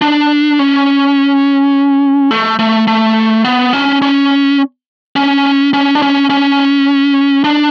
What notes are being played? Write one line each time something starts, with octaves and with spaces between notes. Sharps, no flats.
D4
C#4
A3
A3
A3
B3
C#4
C#4
C#4
C#4
D4
C#4
C#4
D4